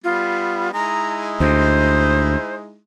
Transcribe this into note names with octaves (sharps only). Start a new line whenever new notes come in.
G3 B3 F4
G#3 D#4 E4 A#5
D2 C5